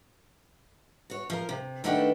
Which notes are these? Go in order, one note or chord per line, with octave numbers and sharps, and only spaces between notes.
F#4 C#5
F3 A#4
C3
D#3 A3 D4 B4 F#5 G5